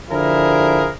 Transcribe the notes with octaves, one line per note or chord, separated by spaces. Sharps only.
D3 F3 E4 G#4 A#4